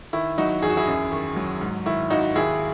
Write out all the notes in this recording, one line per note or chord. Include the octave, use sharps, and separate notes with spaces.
D#3 E4
F#3 D#4 F#4
E2 G#4
F#4
E4 G#4
F#2
D#3
F#3
G#2
D#3 E4
G#1 D#4 F#4
D#2 E4 G#4